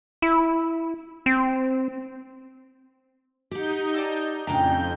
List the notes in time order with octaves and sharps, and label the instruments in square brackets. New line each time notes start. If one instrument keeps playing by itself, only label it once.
[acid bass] E4
C4
[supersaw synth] D#4 G6 [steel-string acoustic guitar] G4 F#5
[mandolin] D5 A5 E6
[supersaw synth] F2 G6 [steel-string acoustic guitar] A2 C#3 D4 [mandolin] G5 A5 A#5